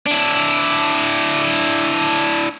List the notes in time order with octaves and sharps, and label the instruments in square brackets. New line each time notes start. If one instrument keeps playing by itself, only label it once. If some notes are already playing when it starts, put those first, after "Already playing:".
[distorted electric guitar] D4 E4